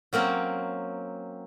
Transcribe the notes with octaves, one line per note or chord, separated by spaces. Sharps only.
F#3 A#3 C4 C#4